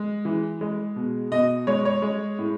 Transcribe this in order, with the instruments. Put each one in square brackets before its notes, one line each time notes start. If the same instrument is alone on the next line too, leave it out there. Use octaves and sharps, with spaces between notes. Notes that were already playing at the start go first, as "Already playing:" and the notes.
Already playing: [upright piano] G#3
E3
G#3
B2
B2 D#5
G#3 C#5
C#5
G#3
A2